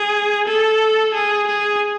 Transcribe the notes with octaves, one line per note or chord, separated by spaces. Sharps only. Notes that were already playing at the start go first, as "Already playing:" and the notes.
Already playing: G#4
A4
G#4
G#4